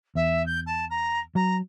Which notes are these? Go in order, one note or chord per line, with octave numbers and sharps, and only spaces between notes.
E2 E5
G6
A5
A#5
F#3 A#5